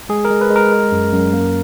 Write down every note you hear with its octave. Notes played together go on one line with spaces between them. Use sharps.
G#3 G#4
A#4
G#3
B4
G#3
A#4
G#3
F#2
F#2
A#3